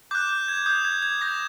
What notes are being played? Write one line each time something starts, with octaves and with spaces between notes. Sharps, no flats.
D6 F#6 G6
G6
G#6
D#6 F#6 G6
G#6
G#6
D6 G6 A#6